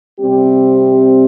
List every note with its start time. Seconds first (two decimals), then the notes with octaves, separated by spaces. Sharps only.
0.20 C3 G3 C4 G4